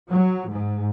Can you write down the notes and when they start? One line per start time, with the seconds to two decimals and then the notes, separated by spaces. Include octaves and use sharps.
0.11 F#3
0.51 G#2